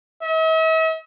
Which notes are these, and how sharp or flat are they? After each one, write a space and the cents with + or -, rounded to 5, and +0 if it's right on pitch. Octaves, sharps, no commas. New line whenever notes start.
E5 -45